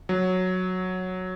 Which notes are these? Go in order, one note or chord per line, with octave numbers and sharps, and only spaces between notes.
F#3